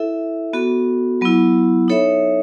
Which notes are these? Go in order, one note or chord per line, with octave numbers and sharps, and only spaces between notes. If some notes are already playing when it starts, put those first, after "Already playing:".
Already playing: E4 A4 E5
B3 F#4 A4
F#3 B3 E4
D#4 A4 C#5 E5